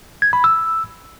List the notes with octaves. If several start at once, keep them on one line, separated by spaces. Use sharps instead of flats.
G#6
B5
E6